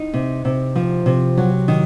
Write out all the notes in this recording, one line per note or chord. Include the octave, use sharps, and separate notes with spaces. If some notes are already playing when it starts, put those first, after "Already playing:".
Already playing: D#4
C3
C3
F3
C3
F#3
D#3